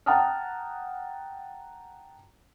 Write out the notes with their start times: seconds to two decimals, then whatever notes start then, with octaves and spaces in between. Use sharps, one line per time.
0.06 F#5 G5 A5 A#5 D#6 F6